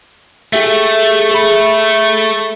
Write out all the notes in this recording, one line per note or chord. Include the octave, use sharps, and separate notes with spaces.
A3 G4 G#4 E5
G#4 B5